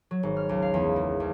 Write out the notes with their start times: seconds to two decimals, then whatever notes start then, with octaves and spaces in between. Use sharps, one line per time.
0.11 F#3
0.23 G#1
0.37 F6
0.49 C#2
0.62 F5
0.74 E2
0.96 A#3
1.20 C#2